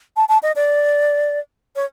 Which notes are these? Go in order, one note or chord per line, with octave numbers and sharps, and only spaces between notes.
A5
A5
D#5
D5
C#5